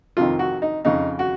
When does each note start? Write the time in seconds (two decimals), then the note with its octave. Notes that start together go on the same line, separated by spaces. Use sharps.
0.17 F2 C3 D#3 F4
0.39 F#4
0.62 D#4
0.85 F2 C#3 D#4
1.19 F#4